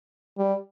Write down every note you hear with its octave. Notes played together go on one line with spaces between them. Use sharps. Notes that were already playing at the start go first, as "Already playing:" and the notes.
G3